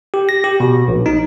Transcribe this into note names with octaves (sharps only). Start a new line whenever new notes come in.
G4
A#6
G4
B2
A#1
D#4